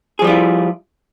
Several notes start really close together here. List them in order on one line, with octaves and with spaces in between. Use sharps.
G#4 F3 G3 F4 E4